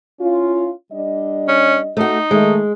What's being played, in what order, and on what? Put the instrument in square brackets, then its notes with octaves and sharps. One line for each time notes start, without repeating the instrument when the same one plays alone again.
[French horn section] C#4 E4 F4
G3 D4 D#5
[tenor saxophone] C#4
[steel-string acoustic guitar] A3 F#4 [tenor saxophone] D#4
[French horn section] D#3 A3 [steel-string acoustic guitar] G#3